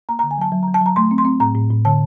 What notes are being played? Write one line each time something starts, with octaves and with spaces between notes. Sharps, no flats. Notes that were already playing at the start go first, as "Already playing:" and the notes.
A#3 A#5
A#5
D3
G#5
F#3 A5
F#3
A#5
F#3
A5
F#3 A#5
A3 C6
C4
C6
C4
A2 A#5
A2
A2
D3 A5